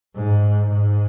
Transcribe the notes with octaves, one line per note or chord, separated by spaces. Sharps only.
G#2
G#2